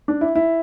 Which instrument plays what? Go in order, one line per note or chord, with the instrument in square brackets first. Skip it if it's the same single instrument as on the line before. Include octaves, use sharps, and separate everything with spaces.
[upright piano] D4
E4
E4